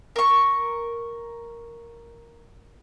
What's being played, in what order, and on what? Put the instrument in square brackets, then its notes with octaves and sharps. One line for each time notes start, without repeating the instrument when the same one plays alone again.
[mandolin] A#4 C#6